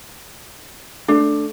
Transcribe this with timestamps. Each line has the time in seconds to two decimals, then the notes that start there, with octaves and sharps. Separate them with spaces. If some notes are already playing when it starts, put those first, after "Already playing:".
1.08 A3 D4